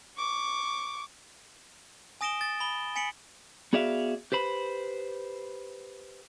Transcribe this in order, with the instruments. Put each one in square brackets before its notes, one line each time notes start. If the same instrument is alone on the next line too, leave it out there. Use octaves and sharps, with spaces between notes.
[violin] C#6 D6
[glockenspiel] G#5 D#6 A#6 D7 E7 G7
A6
B5 G7
G#5 B6 C#7 D7 F#7
[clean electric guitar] B3 F#4 G#4 D5 E5 F5
G4 B4 C5 B5